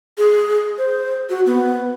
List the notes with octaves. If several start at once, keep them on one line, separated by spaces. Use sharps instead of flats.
G#4
C5
F#4
B3